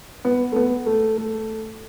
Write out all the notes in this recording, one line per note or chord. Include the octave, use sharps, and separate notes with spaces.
B3
A3
B3
A3
A3